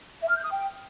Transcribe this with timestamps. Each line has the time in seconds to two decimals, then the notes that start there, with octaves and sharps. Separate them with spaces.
0.21 E5
0.29 F6
0.36 G6
0.44 D#6
0.51 G5